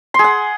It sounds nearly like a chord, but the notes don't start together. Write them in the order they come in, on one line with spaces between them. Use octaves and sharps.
C6 G#4 F#5